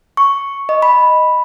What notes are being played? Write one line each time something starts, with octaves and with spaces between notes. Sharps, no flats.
C#6
D#5
B5